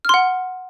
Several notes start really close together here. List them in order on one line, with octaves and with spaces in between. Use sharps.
F6 C6 F#5